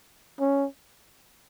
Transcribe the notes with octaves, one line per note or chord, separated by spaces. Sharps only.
C#4